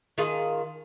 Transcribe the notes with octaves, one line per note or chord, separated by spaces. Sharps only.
D#3 F4 G#4